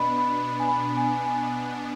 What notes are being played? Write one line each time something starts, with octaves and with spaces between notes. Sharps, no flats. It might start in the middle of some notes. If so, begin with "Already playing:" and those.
Already playing: B2 B3 D4 D#5 B5
B5
G#5
B5
G#5
G#5